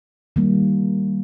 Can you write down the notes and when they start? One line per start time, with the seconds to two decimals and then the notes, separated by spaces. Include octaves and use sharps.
0.36 D#3 G3 A#3